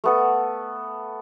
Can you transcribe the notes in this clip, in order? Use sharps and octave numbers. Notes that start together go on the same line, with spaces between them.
A3 B3 A4